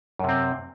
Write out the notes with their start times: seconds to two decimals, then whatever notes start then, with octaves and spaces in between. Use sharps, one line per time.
0.19 F#2
0.24 C3
0.29 C4